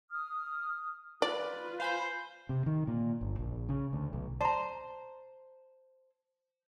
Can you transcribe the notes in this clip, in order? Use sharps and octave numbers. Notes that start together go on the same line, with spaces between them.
D#6 F6
F4 B4 D5
C5 F5 G#5 B5
C3
D#3
A#2
G1
A#1
C#3
D2
B1
C5 D5 A5 A#5